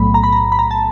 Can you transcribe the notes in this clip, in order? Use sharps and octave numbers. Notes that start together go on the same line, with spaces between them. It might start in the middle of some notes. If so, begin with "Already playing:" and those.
Already playing: B1 A2 F#3 A3 B5
A#5
B5
A#5
B5
A#5
A5